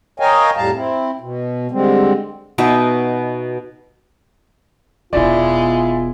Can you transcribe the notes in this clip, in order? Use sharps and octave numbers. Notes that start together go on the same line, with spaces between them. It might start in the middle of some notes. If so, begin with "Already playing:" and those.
A#4 C#5 D#5 F5 G5 G#5
F2 A2 G3 F5 A5 A#5
C4 E4
B2
D3 G3 G#3 C4
B2 D#4 E5
E1 B2 G#3 E4 F4 D5